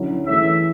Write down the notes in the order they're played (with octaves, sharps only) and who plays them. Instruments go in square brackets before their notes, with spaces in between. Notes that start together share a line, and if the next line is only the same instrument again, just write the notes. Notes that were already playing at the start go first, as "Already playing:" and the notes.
Already playing: [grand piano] D3 F#3 C#4 E4
[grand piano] E3 A3 E4 G#4 C#5 [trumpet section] E5